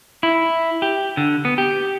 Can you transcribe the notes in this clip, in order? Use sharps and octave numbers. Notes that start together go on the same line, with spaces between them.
E4
G4
D3
B3
G4